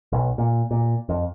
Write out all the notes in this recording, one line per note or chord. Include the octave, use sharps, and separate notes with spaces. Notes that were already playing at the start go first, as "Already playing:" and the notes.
B1
A#2
A#2
F2